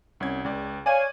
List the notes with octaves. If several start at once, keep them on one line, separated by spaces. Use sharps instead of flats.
C2 C#4 G#6
C#2 D5
C#5 D5 F5 G#5 D#7